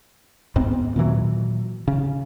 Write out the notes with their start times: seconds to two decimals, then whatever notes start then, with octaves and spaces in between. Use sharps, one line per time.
0.56 D#2 G#2 B3 C4
0.96 A#2 D#3 E3 F#3
1.88 C#3